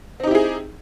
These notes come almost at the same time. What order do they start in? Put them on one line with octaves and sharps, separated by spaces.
C4 D#4 G4 E4 G#4